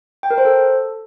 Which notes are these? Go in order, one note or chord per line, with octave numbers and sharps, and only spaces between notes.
G5
A#4
C5
A4